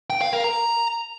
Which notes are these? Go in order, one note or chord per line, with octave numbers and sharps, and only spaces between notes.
G5
F5
A#4
A#5